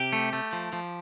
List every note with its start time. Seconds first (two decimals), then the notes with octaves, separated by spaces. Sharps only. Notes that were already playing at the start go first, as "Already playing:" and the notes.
Already playing: C3 G4
0.13 A3
0.33 A3
0.53 F3
0.73 F3